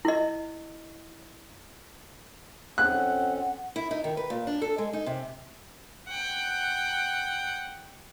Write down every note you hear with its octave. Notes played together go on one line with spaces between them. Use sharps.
E4 D#5
F2 C4 C#4 F#5 F#6
E4
D#4
D#3
B4
A#2
D4
A4
G#3
D#4
C3
F#5 G5